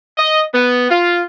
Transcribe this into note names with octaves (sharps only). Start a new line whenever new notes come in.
D#5
B3
F4